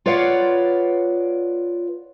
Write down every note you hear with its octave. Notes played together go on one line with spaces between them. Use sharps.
F4 B4 C#5 D5 F5 F#5